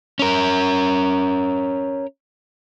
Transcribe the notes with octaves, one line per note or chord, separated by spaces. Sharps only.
C#4 A#4